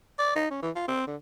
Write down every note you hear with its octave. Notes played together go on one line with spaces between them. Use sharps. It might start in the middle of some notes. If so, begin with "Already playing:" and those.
D5
D#4
C#4
E3
F4
C4
D3